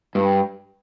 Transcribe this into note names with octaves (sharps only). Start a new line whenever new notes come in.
G2